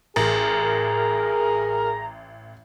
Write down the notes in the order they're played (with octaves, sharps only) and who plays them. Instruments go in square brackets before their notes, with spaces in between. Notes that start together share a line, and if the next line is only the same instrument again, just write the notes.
[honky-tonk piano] A1 [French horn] G#4 [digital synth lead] A#4 [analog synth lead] A#5